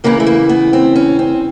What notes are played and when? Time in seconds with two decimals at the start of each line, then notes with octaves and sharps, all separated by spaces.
0.04 E2 C#3 E3 A#3
0.20 A3
0.26 A#3
0.49 B3
0.73 C4
0.96 C#4
1.19 C4